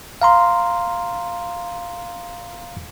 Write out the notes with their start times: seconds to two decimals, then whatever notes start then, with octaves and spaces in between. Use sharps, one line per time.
0.22 F5 A#5 C6